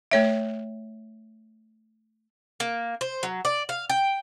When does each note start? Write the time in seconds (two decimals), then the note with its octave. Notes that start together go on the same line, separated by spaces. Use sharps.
0.11 A3 C#5 E5
2.60 A#3
3.01 C5
3.23 F#3
3.45 D5
3.69 F5
3.90 G5